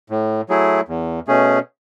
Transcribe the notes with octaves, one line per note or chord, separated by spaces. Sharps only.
A2
F#3 A3 E4 G#4
E2
B2 A3 C#4 G#4